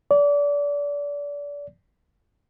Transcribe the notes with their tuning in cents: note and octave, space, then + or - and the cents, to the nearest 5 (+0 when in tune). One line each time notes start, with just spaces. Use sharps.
D5 -30